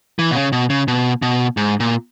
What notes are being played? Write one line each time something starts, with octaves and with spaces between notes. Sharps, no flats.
E3
B2
C#3
B2
C#3
B2
B2
G#2
A#2